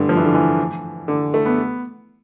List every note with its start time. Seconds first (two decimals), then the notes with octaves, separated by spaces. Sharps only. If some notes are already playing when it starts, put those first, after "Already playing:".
Already playing: G2 D3
0.09 F3
0.17 E3
0.25 D3
0.34 E3
1.08 D3
1.34 A3
1.46 B3